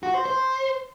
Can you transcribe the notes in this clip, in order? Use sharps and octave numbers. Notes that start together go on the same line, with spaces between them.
F#4
C5
C5